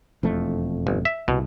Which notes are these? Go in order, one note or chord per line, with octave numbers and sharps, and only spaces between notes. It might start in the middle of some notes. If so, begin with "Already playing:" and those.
E1 F2 A3
G1
E5
C2 B2